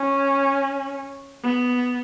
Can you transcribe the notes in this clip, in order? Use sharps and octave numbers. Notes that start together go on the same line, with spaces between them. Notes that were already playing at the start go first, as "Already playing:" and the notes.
Already playing: C#4
B3